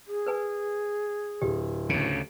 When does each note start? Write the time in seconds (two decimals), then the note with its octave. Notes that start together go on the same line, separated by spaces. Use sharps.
0.07 G#4
0.26 A#4 B4 G#5
1.42 D1 G4
1.89 D2 C#3